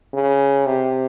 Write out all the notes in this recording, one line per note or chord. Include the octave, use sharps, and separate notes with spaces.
C#3
C3